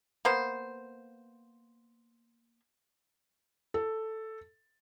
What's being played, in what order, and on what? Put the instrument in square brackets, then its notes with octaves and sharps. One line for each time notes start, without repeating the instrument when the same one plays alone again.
[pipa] A#3 B3 C5
[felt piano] A4